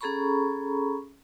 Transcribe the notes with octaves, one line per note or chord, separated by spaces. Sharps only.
C#4 G#4 A4 A#5 B5 C#6